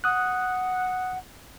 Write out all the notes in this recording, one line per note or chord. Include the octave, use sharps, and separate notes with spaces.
F#5 D#6 F#6